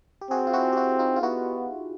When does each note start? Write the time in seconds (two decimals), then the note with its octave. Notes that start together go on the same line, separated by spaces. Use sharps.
0.21 G4
0.30 C4 F#4 G#4
0.47 F4
0.53 E4 F#4
0.72 G4
0.77 E4 F#4
0.99 D#4 F4
1.16 F4
1.22 B3 E4 F#4